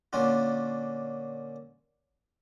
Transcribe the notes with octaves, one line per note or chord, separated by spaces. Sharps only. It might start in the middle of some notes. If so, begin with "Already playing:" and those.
A#2 D3 A#3 C#4 D4 F4